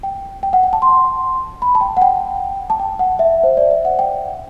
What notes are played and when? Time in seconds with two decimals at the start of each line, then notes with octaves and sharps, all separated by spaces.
0.03 G5
0.43 G5
0.53 F#5
0.63 G5
0.73 A5
0.82 C6
1.62 B5
1.75 A5
1.81 G5
1.97 F#5
2.02 G5
2.70 A5
2.80 G5
2.99 F#5
3.19 E5
3.43 C5
3.57 D5
3.71 E5
3.85 F#5
3.99 G5